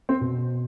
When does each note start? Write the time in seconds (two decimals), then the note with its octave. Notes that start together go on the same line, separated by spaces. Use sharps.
0.09 C4
0.21 B2